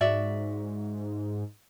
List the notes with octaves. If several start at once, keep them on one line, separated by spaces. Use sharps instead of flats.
G#2 F#4 D5 E5